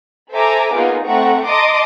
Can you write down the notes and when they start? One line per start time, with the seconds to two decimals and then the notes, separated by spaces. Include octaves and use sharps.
0.32 A4 C5 E5 G#5 A#5 D6
0.73 A#3 B3 D#4 F4 G#4
1.05 A3 C4 F#5 A#5 C#6
1.47 D#5 A5 A#5 C6 D6 D#6